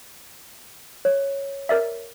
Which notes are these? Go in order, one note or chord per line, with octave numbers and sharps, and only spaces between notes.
C#5
A#4 D5 E5